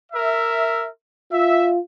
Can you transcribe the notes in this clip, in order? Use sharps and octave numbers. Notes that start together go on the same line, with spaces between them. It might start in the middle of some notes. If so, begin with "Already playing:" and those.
A#4 E5
F4 E5